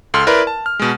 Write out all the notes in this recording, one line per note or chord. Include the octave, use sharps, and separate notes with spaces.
C#2 A4 C6 F6
E4 A#4 B4 D5 B5 C6
A5
F6
B2 G#3